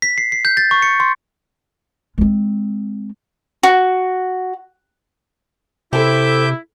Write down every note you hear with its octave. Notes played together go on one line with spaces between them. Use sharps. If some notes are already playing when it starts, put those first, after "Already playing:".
B6
C7
C7
G6
A6
C#6
C#7
C6
G#3 C4
F#4
C3 C4 E4 A4 E5 D6 G6